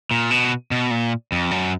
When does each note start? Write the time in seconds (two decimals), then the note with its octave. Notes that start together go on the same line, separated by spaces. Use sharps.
0.11 A#2
0.31 B2
0.71 B2
0.91 A#2
1.32 F2
1.51 F#2